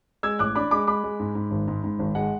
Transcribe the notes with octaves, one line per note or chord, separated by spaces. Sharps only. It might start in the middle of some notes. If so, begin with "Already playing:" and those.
G#3 E6 G#6
A1 D6 F#6
D4 B5 D6
G#3 B5 D6
G#3 B5 D6
G#3
G#2
G#2
G#1
G#2
G#2
G#1
G#3 F#5